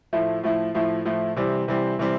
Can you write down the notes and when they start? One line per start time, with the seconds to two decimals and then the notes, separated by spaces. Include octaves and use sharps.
0.13 A2 F3 A3 E4
0.43 A2 F3 A3 E4
0.75 A2 F3 A3 E4
1.05 A2 F3 A3 E4
1.36 C3 E3 G3 C4
1.68 C3 E3 G3 C4
1.99 C3 E3 G3 C4